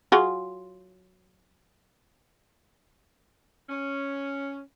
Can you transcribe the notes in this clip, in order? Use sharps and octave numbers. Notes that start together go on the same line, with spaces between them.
F#3 F4 G#4
C#4